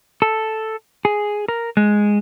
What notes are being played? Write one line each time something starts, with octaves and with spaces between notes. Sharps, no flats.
A4
G#4
A#4
G#3